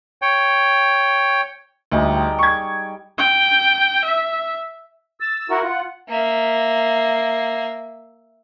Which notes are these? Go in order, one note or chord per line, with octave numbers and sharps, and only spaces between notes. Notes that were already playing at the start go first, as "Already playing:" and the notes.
C#5 G5
D2 G3 G#3 D#4
G5 A#5
C#6 G#6
G5
E5
E6 A6
E4 F#4 A#4 F#5
F4
A#3 E5